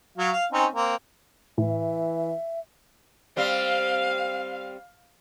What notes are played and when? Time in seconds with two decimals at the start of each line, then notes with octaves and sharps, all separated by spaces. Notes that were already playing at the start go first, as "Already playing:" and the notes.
0.18 F#3 F5
0.33 F5
0.52 C4 C#4 D#4
0.74 A#3 C4
1.58 A2 E3 E5
3.37 G3 C4 F5